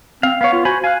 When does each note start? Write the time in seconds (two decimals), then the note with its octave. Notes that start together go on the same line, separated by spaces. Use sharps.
0.23 C4 F5
0.41 B3 C#5 F5
0.53 F4
0.65 F#4 C5 G#5 B5
0.84 F5 G#5 F#6